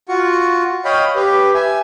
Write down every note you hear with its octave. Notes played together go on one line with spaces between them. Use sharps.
F4 F#4 C#6
C#5 D#5 F5 G5 B5
G4 B4
E5 G#5